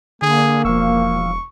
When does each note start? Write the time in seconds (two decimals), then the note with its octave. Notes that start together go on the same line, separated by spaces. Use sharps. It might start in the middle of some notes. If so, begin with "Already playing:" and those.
0.22 D3 A#3 G#4
0.65 E1 F3 F5 C#6 E6